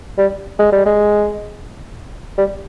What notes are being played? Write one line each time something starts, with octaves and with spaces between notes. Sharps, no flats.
G3
G#3
G3
G#3
G3